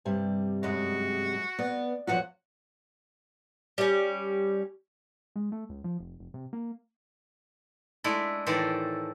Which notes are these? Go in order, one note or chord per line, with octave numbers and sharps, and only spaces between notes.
G2 C3 G3
F#2 G#3 F#4
B3 D5
E2 F3 F4 F#4 C#5 F#5
G3 C#4
G#3
A3
C#2
F3
F1
F1
C3
A#3
G#3 A3 D4 E4
A2 D#3 E3 A4 C5 D5